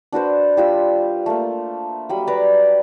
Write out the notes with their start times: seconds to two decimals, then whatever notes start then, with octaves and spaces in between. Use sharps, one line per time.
0.12 D4 F#4 B4 C5
0.57 G3 F4 E6
1.26 A3 A#3
2.09 F#3 G3 B5
2.28 B4 D5 A5 A#5